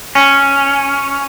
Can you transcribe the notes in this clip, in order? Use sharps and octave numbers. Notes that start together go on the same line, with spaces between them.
C#4